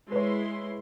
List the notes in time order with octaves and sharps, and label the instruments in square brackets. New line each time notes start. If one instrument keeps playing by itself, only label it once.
[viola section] G#3 E4 C6 [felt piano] B4 C#5